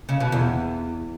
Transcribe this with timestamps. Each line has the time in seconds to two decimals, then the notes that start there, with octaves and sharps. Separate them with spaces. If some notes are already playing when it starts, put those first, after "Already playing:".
0.09 C#3
0.20 B2
0.32 E2